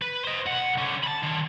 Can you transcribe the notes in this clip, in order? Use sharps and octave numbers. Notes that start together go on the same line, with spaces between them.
B4
C5 D#5
B1 F#5
D3 C#4
A5 B5
D#3 D4